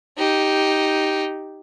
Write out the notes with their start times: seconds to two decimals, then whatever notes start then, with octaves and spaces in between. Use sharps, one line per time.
0.17 D#4 G4